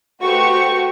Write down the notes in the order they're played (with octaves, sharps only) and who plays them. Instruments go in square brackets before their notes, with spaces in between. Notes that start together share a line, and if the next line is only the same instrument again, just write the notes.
[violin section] A3 F#4 G4 B4 C5 C#6